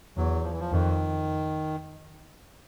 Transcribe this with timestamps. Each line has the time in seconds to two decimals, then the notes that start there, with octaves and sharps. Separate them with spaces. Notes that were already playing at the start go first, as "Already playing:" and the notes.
0.17 E2 F#3
0.44 F3
0.52 E3
0.60 F3
0.72 F2 D#3